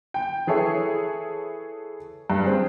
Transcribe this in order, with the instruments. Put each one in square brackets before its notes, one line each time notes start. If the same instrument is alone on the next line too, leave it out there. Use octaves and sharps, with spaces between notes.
[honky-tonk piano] G5
E3 G#4 A4 C#5 E5
G2
C4 G#4